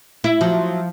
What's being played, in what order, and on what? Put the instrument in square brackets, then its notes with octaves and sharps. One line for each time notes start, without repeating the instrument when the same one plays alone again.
[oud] E4
[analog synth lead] F3 [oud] F#3